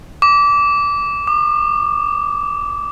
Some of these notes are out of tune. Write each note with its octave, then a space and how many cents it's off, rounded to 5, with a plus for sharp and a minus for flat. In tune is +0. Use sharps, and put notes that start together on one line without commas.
D6 -20
D6 +45